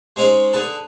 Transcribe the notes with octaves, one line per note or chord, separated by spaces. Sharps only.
G#3 C4 C#4 D#4 G#4
D3 G#4 B4 A5